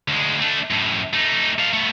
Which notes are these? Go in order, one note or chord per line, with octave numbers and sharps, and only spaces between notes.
D2 G#3
A3 D4
F#2 A2
A3 D#4
A4 F5
A3 B3